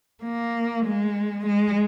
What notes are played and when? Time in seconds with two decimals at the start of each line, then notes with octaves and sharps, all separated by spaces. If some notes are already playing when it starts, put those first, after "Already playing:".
0.23 A#3
0.85 G#3
1.46 G#3